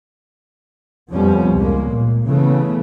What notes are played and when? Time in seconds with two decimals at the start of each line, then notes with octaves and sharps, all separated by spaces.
1.11 F2 F3 G3 B3 C#4
1.56 C#2 G#3 A#3
1.89 A#2
2.26 C#3 E3 A3 B3